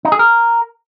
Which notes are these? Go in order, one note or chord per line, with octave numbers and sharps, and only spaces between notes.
D#4
G#4
A#4